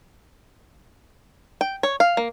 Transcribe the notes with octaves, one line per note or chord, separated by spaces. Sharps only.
G5
C#5
F5
A#3